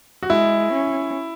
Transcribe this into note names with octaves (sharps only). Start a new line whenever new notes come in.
F#4
G#3 E4
C#4